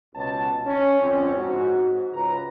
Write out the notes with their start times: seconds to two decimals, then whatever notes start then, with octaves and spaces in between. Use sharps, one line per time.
0.15 C#2 B2 A5
0.66 C#4
1.01 F2 D3 F3 G#3 C4 C#4
1.35 G#2 F#4
2.14 C#2 B4 A#5